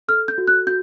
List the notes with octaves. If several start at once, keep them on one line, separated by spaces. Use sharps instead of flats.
A4 F6
G6
F#4
F#6
F#4 G6